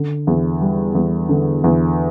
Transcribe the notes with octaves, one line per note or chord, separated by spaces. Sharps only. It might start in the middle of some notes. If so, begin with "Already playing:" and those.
Already playing: D3
E2
G3
E2
D3
E2